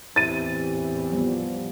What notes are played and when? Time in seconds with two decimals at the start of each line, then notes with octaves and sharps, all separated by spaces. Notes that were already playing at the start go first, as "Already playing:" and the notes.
0.16 E2 A2 E3 C4 E4 G4 A6 D#7
1.12 F3 G3 B3